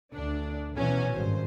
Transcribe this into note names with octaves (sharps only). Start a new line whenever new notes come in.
D2 D4
B2 E3 F#3 C#4 G#5
G#1 G2 C5